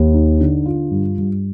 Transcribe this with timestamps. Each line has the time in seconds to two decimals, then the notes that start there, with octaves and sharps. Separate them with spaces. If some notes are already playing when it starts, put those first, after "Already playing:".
Already playing: D#2
0.14 D#4
0.41 D3
0.66 F4
0.91 G2
1.18 G2